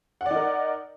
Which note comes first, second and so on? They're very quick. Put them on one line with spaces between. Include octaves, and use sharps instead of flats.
F#5 D5 D#4 A#4